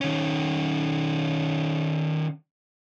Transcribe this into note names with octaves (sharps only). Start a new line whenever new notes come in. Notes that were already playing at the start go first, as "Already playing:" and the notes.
D#3 C#4